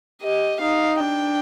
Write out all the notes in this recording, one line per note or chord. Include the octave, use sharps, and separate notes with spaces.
G4 D#5
D#4 F5
D4 G5